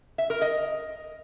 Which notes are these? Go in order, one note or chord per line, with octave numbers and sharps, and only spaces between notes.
E5
A#4
D#5